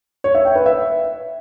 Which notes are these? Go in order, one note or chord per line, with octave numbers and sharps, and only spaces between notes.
C#5
E5
G5
B4
E5